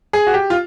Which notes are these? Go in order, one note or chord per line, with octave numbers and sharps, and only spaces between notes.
G#4
F#4
G4
F4